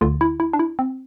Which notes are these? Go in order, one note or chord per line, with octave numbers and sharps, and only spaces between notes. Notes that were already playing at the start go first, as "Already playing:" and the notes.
D2 D3 F4
E4
E4
D4
E4
C4